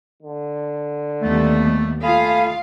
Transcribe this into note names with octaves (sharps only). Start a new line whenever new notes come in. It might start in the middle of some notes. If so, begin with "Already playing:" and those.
D3
D#2 G3 A3 B3
A3 F4 F5 G#5 B5 D#6